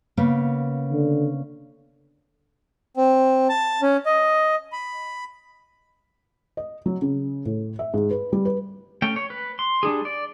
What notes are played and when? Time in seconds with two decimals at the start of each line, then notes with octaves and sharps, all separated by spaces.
0.17 C#3 A#3 B3
0.92 D3
2.97 C4
3.49 A5
3.82 C#4
4.06 D#5
4.72 B5
6.57 D#5
6.86 F#3
7.02 C#3
7.46 A2
7.79 E5
7.94 G#2
8.11 B4
8.33 G3
8.45 B4
9.02 A3 C#4 G5
9.16 C#5
9.30 B4
9.59 C6
9.83 G3 D4 G#4
10.05 D5